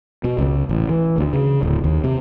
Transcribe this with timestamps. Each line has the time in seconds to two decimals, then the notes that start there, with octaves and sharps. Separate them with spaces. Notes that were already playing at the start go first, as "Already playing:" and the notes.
0.24 B2
0.38 C#2
0.69 A1
0.89 E3
1.18 D2
1.33 C#3
1.63 D1
1.84 D#2
2.04 C3